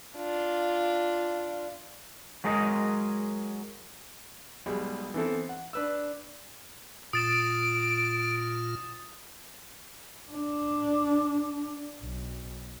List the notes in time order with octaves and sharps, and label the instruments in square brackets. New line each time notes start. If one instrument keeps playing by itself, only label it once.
[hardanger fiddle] D4 F4
[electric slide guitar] F#3 G#3 G#4 A#4 D5 D#5
[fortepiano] B1 G3 G#3
E3 B3 C4 A4
F#5
D4 B4 E6
[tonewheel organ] A#2 F4 [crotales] D#6 A6 E7 [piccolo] D7
[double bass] D4
B1